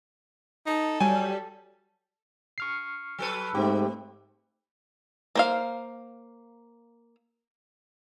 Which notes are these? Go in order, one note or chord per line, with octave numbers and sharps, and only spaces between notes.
D#4 A4
F#3 G3 G#5
C#6 F6 C7
F#3 A4 B4
G#2 A3 C4 G4
A#3 C5 F5